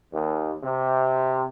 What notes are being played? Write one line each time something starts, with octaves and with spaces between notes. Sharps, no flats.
D#2
C3